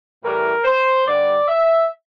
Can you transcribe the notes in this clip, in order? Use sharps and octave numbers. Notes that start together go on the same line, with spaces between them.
A2 E3 G3 A#4
C5
G2 D3 G3 D5
E5